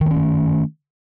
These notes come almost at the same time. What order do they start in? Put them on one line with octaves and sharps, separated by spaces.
D#3 A#3 C#4 A3